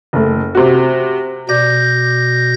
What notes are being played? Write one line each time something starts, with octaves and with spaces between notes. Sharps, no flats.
F#1 A3
C3 F#4
B2 D5 G6 A#6